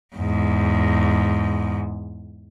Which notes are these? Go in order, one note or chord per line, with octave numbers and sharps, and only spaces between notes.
E2 G#2